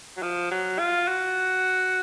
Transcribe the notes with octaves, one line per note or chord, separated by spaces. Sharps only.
F#3
F3
F#3
F4
F#4